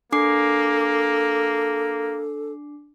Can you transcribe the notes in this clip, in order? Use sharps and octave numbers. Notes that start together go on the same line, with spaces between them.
A#3 D4 A4 D6 C7